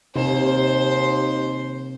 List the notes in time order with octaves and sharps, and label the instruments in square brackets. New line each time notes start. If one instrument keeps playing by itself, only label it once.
[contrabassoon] D#2 [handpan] C3 [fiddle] C5